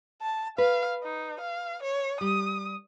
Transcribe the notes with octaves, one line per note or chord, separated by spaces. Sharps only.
A5
B4 F5
D#4
F5
C#5
G3 D#6